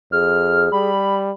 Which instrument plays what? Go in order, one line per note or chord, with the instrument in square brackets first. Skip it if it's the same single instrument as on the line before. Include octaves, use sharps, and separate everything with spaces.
[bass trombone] F2 [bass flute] G#4 [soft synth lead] F6
[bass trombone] G3 [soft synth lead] B5